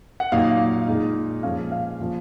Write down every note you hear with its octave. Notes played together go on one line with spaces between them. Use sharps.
F#5
A#2 F#3 A#3 D#4 F5
F5
A#2 G#3 D#4
A#2 F3 G#3 C#4 F5
F5
A#2 F3